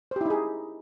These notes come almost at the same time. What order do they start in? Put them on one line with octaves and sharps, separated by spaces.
C5 G4 E4 D#4 G#4